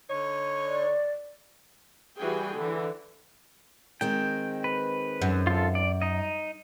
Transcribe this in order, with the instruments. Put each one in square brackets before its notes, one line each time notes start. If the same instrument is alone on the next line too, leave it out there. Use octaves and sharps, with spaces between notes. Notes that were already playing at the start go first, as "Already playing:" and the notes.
[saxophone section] D3 D#4 C#5
[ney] D5
[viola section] E3 G3 F#4 G#4 G5 G#5
D3 E3
[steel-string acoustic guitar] D#3 G#3 C4 [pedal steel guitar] G5
[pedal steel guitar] B4
[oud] F#2
[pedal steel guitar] F4 A4
D5
D#4 D#5